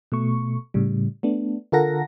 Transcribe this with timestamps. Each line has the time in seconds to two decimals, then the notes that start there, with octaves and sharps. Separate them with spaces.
0.12 B2 A3 C#6
0.74 A2 C#3 G3
1.23 A3 B3 D4
1.72 D3 F4 A4 A#4 F#5 A#6